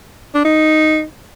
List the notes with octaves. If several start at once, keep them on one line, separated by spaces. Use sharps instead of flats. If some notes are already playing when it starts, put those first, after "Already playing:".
D4
D#4